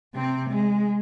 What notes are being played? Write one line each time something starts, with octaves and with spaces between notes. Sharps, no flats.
C3 C4
G#3